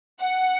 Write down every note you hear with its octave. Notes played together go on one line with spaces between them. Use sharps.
F#5